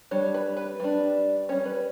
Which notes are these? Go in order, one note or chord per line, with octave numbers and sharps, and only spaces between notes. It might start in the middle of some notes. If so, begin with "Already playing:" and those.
G3 D4 C#5
B4
B4
G3 D4
G3 C#4 C#5
B4